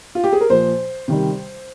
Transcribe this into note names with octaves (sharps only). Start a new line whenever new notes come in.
F4
G4
G#4
A#4
A#2 F3 C5
C3 D#3 G3